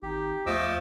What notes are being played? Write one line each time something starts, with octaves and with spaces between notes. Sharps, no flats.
G#1 D#4 G4
E2 F3 A3 D#5 D6 E6